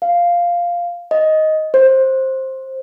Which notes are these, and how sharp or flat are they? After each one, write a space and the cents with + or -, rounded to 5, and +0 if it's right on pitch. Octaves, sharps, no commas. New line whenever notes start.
F5 -5
D#5 +10
C5 +15